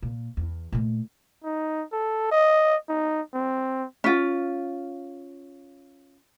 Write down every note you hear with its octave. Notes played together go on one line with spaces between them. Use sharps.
A#2
E2
A#2 A3
D#4
A4
D#5
D#4
C4
C#4 F4